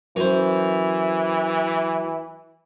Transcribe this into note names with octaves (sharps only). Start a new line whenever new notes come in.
F#2 E3 C5